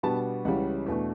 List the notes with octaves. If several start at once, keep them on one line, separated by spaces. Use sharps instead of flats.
B2 G3 B3 D4 A5
C#2 C#3 E3 G3 C#4 F#5
E2 B2 A3 D4